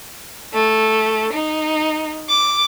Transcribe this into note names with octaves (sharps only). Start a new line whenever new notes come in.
A3
D#4
D6